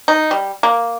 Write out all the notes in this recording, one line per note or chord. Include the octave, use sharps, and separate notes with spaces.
D#4
G3
A#3